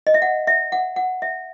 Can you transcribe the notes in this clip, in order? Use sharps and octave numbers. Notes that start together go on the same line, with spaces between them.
D#5
E5
F#5
E5
F#5
F#5
E5